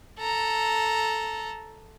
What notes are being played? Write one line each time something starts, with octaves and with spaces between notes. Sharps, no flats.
A4 A#5